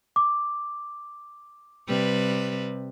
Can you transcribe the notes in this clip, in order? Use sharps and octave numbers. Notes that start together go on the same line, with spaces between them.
D6
C3 G3 B4